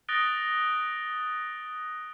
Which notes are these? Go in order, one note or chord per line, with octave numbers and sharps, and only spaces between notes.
D#6 F#6 A6 A#6 D7 G7